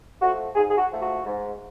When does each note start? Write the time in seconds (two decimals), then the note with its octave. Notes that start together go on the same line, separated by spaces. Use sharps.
0.20 F3 A3 F#4
0.55 G#2 G#4
0.71 G#4
0.78 F#4
0.90 F3 A3
1.01 F#4
1.25 G#2